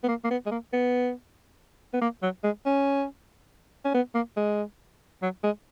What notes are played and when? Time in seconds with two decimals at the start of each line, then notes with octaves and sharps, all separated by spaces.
0.04 B3
0.08 A#3
0.24 A#3
0.30 B3
0.46 G#3
0.51 A#3
0.73 B3
1.93 B3
2.01 A#3
2.22 F#3
2.43 G#3
2.66 C#4
3.85 C#4
3.94 B3
4.15 A#3
4.37 G#3
5.22 F#3
5.43 G#3